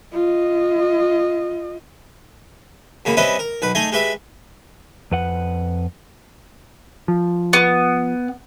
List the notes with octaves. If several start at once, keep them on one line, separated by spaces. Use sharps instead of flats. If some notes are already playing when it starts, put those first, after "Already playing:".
F4 D#5
F#2 C#3 A#3 B5
G3 C4 C#4 B4 D#5 E5
A#4
B1 B4
A3 D#4 G#4 D#5
G#3 G4 B4 E5 B5
F2 B4 F#5
F3
B3